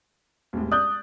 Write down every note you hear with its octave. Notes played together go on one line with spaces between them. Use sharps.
E1 C2 A2
D5 D#6 F#6 G6